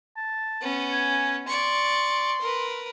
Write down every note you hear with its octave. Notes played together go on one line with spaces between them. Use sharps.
A5
B3 C#4
G#5
D5 C6 C#6
A#4 B4